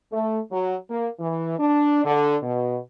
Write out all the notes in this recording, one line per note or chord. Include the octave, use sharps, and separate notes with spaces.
A3
F#3
A#3
E3
D4
D3
B2